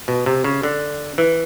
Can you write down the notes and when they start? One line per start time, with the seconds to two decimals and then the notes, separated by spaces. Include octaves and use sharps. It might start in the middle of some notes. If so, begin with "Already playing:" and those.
0.08 B2
0.26 C3
0.44 C#3
0.63 D3
1.18 E3